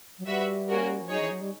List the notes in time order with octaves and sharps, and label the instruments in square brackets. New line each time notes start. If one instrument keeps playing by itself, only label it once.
[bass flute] F#3
[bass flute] G3 [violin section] F#4 B4 E5
[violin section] A#3 C#4 F#4 A#4
[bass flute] F3
[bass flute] F#3 [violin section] D#4 G#4 C#5
[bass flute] E3
F#3
G3